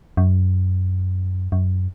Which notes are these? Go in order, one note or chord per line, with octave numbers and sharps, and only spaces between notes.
F#2
F#2